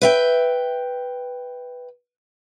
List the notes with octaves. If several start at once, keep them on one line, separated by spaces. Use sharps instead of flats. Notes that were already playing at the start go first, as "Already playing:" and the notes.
B4 E5 G5